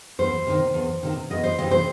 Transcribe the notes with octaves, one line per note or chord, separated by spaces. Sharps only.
E2 C5
C3 D#3
E2
C3 D#3
E2 D#5
C5
C3 E3 D#5
C5